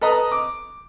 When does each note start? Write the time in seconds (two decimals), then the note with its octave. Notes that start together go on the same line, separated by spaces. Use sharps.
0.01 A4 B4 D#5 A#5 D#6
0.32 D6